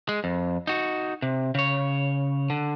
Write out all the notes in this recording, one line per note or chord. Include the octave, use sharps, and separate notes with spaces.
G#3
F2
D#4 F#4
C3
C#3 C#5
D3